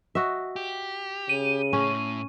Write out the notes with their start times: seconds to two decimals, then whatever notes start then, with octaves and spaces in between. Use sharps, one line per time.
0.15 F#4 D#5 E5
0.56 G4
1.29 C#3 D#7
1.73 A2 C#4